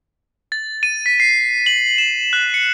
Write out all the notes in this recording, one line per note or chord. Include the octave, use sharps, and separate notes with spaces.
A6
D#7
B6
C7
F#7
E7
F#6
C#7